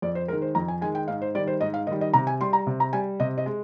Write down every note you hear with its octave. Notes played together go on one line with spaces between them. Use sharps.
F2 D5
C5
D#3 G#3 A#4
C5
F2 A#5
G#5
D#3 G#3 G#5
G5
G#2 F5
C5
D#3 G3 D5
C5
G#2 D#5
F5
D#3 G3 D#5
D#5
C3 A#5
G#5
G3 C6
A#5
C3
A#5
G3 G#5
C3 D#5
D#5
G#3